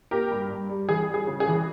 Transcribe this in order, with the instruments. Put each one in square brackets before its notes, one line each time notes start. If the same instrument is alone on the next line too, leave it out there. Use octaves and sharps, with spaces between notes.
[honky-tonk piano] A#3 G4 A#4
G2
G2
G3
E3 G#4
G3
G#4
C#3
G#4
E3